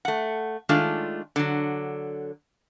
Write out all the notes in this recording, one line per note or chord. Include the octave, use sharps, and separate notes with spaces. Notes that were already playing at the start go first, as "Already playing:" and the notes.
A3 F#5
D#3 G#3 A3 D4 F4
D3 F#3